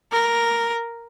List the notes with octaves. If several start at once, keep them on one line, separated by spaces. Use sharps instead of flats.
A#4